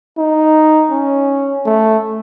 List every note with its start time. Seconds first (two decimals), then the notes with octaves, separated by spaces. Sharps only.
0.18 D#4
0.91 C#4
1.66 A3